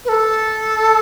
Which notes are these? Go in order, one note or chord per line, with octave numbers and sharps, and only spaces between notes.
B4
A4